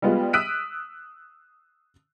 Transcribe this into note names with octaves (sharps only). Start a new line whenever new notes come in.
G3 G#3 B3 F4
D#6 E6 F#6 B6 D7 D#7